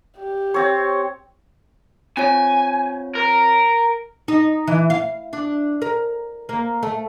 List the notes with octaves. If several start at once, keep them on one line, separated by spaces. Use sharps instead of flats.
G4
C4 C#5
C4 F4 C#5 G#5
A#4
D#4
E3
F5
D4
A#4
A#3
A3